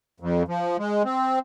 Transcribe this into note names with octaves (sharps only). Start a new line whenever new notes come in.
F2
F3
G#3
C4